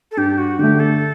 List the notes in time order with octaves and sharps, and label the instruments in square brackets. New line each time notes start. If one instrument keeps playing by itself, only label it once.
[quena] A4
[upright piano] G2 [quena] G4
[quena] F#4
[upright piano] D3 A3 [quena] G4
[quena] A4